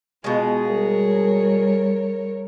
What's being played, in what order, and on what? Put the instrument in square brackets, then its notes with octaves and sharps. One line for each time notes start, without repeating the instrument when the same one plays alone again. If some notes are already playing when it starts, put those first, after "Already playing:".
[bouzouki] B2 G#3 [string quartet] F4 [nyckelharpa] G#4
[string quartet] G3 A#4 C#5